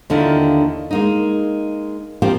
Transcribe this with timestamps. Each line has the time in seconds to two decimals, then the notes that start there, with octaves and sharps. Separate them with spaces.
0.10 D#2 D3 D#3 E4 F4
0.91 G#3 A#3 D#4
2.22 F3 A#3 C4 F4 G4